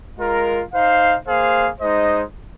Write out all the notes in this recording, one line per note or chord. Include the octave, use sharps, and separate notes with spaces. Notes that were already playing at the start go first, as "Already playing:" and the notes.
G#3 F4 A#4
D#4 C5 F5
A#3 G#4 C5 F5
G#3 D#4 C5 D#5